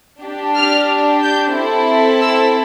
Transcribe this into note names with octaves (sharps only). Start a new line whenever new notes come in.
D4 G4
F6
G6
C4 E4 A4
E6